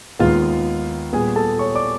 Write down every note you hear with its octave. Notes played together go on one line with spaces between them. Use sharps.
D#2 D#3 G#3 B3 F4 F5
A#2 G3 B3 G#4 G#5
A4 A5
C#5 C#6
D5 D6